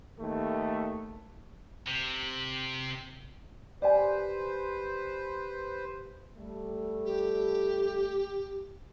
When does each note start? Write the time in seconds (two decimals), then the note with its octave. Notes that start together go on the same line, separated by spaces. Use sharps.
0.19 D#2 A3
1.86 C3
3.82 G4 B4 C5 D5 G#5
6.38 G3 A3
7.05 G4